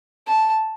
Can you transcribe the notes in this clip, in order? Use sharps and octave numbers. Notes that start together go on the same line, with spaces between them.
A5